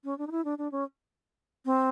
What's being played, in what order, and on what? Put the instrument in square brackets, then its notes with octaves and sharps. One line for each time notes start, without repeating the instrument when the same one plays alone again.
[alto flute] C#4
D4
D#4
E4
D4
D4
C#4
C4